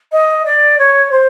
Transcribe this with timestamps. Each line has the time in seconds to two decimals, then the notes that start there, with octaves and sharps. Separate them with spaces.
0.12 D#5
0.45 D5
0.79 C#5
1.11 C5